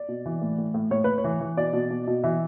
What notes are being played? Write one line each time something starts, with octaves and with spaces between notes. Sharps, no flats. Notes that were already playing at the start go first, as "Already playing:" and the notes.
Already playing: D5
B2
E3
A2
A2
A2
A2 C#5
A2 B4
C#5
E3
E3
B2 D5
B2
B2
B2
E3 E5